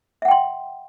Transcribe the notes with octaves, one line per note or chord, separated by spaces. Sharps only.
E5 F#5 G5 C6